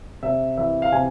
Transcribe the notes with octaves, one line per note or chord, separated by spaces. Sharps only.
C3 E5
E3 E5
F5
C3 G#5